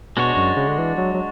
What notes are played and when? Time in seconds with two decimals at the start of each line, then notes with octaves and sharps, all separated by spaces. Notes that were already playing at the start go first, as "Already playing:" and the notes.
0.17 B2 G#3 D4 F#4 C#5
0.37 F#2
0.57 C#3
0.68 D3
0.78 E3
0.98 F#3
1.14 F#3